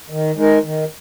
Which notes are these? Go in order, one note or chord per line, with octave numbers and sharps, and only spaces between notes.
D#3
G#3 D#4 A#4
D#3